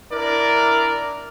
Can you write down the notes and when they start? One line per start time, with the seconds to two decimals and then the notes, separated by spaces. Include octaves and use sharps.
0.13 D4 E4 A#4 D5